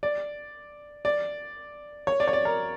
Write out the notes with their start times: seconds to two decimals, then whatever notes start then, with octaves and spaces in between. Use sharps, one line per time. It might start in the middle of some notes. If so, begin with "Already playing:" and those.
0.03 D5
1.05 D5
2.07 C#5
2.20 D5
2.28 C#5
2.33 D5
2.45 A#4